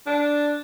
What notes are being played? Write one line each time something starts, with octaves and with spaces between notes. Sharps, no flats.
D4